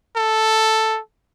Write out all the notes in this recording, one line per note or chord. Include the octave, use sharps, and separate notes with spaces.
A4